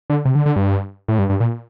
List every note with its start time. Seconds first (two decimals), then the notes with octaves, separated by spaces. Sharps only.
0.10 D3
0.25 C3
0.35 D3
0.46 D3
0.56 G2
1.08 A2
1.19 G2
1.30 G2
1.40 A#2